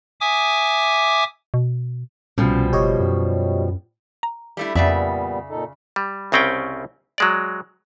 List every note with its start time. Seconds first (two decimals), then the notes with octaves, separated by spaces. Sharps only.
0.21 E5 G#5 D6 D#6
1.54 B2
2.38 C2 B2 F3 G3 C#4
2.73 F#1 G4 C#5 D#5
3.00 F#2
4.23 A#5
4.57 G3 A3 E4
4.76 F2 A#2 C#3 G3 B3 D5 E5
5.49 A#2 D#4 A4
5.96 G3
6.32 C2 C#3 C4 C#4 G5
7.18 F#3 G#3 D5